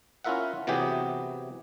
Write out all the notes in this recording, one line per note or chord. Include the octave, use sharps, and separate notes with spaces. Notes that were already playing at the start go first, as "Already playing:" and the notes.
C#4 E4 F4 A#4 E5 F#5
C3 E3 F#3 B3 G4 G#4